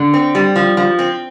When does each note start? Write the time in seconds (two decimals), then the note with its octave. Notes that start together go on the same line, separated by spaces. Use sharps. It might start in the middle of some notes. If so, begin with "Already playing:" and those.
Already playing: D3
0.14 C4
0.35 G3
0.56 F3
0.77 F3
0.99 C4